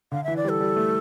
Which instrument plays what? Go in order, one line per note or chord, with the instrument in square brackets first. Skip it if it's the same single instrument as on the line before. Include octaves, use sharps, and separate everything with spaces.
[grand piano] D3 [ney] F5
[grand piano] E3 [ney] E5
[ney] D5
[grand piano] G3
[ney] A4
[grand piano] G3
A3